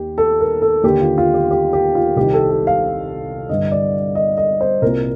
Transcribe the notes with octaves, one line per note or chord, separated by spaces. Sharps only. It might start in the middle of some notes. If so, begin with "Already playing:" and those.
Already playing: D#2 D#3 G4
A4
A#4
A4
D#2 D3 G4
F4
F4
G4
G4
G4
F4
C2 C3 D#3 G4
A4
G4
F5
G2 D3 D#5
D5
D#5
D#5
C5
C2 A#2 A#4